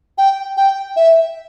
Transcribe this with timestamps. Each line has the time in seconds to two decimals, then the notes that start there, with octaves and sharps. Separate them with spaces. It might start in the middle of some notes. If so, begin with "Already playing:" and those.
0.18 G5
0.57 G5
0.96 E5